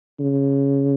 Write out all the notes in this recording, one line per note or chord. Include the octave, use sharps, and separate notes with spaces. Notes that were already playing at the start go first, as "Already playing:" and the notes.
C#3